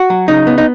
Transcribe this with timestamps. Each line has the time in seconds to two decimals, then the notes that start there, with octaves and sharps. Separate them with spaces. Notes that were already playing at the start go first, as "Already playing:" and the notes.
Already playing: F#4
0.10 F#3
0.28 C#3 D#4
0.47 B3
0.58 D#4